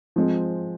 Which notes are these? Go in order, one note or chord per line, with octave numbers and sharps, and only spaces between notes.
F3 G#3 C4